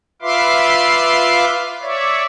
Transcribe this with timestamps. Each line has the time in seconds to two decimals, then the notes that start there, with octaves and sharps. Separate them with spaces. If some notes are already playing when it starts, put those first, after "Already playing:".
0.22 F4 B4 E5 F5 C6 D6
1.82 C#5 D5 E5